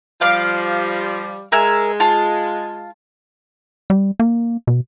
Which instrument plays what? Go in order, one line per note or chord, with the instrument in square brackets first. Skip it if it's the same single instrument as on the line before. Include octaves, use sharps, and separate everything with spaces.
[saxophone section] F3 G3 [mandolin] D5 F5
[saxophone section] G#3 [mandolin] A#4 E5 G#5
[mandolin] F4 A5
[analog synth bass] G3
A#3
B2